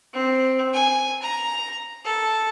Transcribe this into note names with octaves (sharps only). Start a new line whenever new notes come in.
C4
G#5
A#5
A4